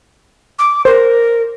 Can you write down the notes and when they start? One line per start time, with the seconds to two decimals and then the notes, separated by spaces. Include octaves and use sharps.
0.58 D6
0.85 A#4 C5